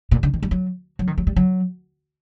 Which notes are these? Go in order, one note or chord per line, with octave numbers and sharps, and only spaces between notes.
A#2
D3
D#3
G3
F#3
F#3
D#3
F#3
G3
F#3